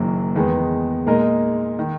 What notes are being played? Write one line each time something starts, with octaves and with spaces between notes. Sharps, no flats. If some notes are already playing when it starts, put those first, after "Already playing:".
Already playing: F#1 F#2 D#3 F#3 A#3
E2 D#3 G#3 B3
A#2 G#3 D#4 A#4 D#5
D#3